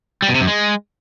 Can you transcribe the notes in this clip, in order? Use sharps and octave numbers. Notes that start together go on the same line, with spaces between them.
G3
B2
C3
F#2
G#3